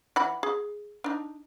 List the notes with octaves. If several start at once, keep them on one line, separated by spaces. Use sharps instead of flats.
E3 F#5 B5
G#4
D4 D#4